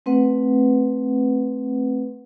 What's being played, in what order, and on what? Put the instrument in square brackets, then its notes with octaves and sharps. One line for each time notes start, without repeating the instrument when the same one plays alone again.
[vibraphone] A3 C4 B4 F#5